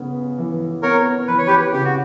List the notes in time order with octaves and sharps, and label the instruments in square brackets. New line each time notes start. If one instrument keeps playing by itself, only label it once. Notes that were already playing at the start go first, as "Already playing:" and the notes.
Already playing: [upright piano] C#3 B3
E3
[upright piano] B3 [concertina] A#4 C#5
[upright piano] E3 [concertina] B4
[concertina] C#5
G4 B4
[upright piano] C#3 [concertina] G4
[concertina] F#4